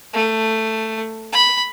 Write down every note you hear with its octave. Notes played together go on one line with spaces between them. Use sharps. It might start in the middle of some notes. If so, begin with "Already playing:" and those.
A3
B5